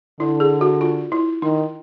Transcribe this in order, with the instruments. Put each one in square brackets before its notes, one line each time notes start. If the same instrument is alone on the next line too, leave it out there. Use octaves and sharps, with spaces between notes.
[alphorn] D3 [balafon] E4
[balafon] G#4
F#4
F4
E4
[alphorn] D#3 [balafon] D#4